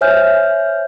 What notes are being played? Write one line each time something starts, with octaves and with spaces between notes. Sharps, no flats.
C5 C#5 E5 G#5 F6 G6